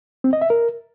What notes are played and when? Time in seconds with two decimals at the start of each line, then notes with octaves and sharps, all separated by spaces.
0.24 C4
0.33 D#5
0.41 E5
0.50 A#4